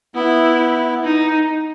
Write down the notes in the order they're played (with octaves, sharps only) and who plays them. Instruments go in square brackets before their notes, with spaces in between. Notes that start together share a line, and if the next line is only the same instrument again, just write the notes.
[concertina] B3 [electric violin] E4
[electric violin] D#4